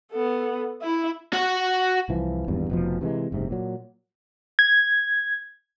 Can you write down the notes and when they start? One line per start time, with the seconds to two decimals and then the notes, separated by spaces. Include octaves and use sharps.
0.12 B3 A4
0.82 E4 E5
1.33 F#4 F#5
2.09 C2 E3 F3
2.48 G#1 E2 G2
2.70 F1 B2 F3
3.01 C3 E3 F3 G#3
3.32 F#1 G#2 C3
3.50 A#2 F#3
4.59 G#6